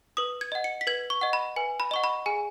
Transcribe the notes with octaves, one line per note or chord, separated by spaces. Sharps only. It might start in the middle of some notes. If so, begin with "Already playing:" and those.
B4 D#6
G#6
D#5 F#5
C#7
B6
B4 G#6
C#6
D#5 F#5
B5
B4 G#5
B5
D#5 F#5 C#6
B5
G#4 G#5